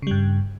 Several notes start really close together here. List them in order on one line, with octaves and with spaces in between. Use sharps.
C#3 G3 G2